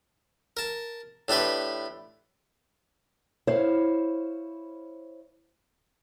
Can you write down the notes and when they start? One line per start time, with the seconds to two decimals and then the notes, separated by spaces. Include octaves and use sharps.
0.57 A#4 A5
1.28 A2 D4 G4 B4 C6
3.47 E4 C5 C#5 F5